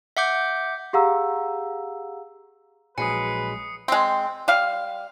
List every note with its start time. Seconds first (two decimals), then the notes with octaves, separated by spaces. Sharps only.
0.17 E5 F#5 D6 G6
0.93 G4 G#4 F5 F#5 A#5 E6
2.98 A#1 F#3 G#3 B4 G#5 D#6 C7 C#7
3.88 G#3 C4
4.48 G3 F5